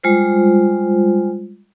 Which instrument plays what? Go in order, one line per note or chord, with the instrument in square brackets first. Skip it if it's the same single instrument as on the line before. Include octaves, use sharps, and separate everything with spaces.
[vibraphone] G3 G#3 F4 C5